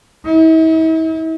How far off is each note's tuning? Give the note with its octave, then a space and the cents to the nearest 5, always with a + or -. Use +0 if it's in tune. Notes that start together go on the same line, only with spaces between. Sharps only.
E4 -45